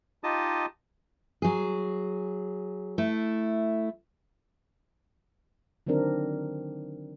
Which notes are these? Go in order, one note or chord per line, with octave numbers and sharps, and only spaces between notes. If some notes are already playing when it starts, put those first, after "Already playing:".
D#4 F4 G4 D#5 A5 D#6
F#3 G#4
A3 E4
D3 D#3 F#3 C4 D4 A#4